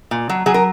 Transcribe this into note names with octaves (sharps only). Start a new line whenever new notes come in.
A#2
F#3
F#3 G#4
A#4